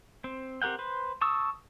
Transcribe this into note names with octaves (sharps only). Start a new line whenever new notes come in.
C4
C4 G4 A#4 F#5 G5
B4 C5
A5 C#6 D#6 E6